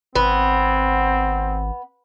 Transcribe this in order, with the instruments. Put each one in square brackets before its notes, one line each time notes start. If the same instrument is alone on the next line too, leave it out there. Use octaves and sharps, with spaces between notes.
[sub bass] G#1 [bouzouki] B3 [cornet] C4